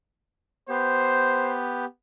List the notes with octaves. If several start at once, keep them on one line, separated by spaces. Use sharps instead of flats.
B3 G4 C5